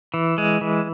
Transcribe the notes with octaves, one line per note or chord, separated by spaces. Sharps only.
E3
G#3
E3